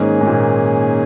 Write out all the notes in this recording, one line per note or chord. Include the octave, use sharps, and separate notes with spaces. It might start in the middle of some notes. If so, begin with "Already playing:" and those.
Already playing: G#2 D#3 A#3 C#4 G#4
G#2
A#2